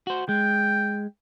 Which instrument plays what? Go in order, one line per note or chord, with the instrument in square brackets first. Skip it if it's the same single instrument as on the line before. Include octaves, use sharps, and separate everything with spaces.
[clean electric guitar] F#4 C5
[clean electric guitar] G#3 [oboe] G5